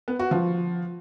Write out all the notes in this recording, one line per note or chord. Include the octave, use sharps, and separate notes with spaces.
B3
F#4
F3